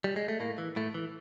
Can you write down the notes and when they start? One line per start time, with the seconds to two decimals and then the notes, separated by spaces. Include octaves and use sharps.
0.04 G3
0.16 G#3
0.28 A3
0.40 A2 A#3
0.58 E3
0.76 A2 A3
0.94 E3